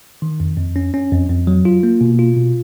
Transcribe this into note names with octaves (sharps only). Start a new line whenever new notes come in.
D#3
F2
F2
C#4
C#4
F2
F2
F#3
F4
A#3
B2
F4
B2